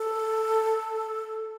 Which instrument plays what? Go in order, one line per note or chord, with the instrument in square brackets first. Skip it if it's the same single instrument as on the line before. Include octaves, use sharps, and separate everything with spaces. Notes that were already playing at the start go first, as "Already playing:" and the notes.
Already playing: [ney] A4